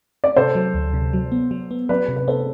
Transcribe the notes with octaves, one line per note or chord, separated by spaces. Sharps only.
D5
C3 A4 C5
F#3
D2
C3
F#3
B3
F#3
B3
F#3 B4 D5
C3
B4
B3 A4 C5